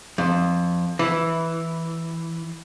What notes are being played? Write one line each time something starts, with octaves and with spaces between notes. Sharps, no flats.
F2
E3